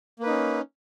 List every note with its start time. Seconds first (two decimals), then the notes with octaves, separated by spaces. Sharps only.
0.20 A#3
0.23 B4
0.26 D#4
0.30 C#4